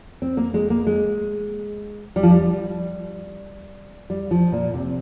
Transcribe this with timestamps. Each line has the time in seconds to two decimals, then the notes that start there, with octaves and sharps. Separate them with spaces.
0.22 C4
0.37 A#3
0.54 G#3
0.70 A#3
0.87 G#3
2.16 G3
2.23 F3
2.30 G3
4.10 G3
4.31 F3
4.52 A#2
4.74 C3